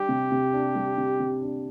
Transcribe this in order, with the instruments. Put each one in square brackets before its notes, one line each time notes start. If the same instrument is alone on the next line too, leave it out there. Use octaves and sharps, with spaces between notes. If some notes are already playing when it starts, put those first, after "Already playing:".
Already playing: [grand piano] G3 D4 [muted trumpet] G4
[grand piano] C3
C3
D4
G3
C3
C3
D4